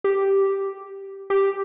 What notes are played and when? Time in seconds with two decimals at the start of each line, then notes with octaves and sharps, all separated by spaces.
0.04 G4
1.30 G4